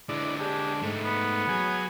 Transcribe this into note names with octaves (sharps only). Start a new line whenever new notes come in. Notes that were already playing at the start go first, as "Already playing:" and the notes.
D3 G#3 D4 E4 D5
D4 G4 G#4
G#2 A3 D#4
B3
F#3 G#4 G#5